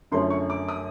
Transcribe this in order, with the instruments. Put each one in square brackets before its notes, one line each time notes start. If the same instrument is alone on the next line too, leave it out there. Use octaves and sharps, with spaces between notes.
[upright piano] F#2 D3 F3 A3 C#4 C6
C#6
D6
D#6